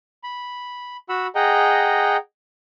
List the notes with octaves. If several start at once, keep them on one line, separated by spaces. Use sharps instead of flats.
B5
F#4 F#5 B5 E6
G#4 D#5 F#5 G5 A#5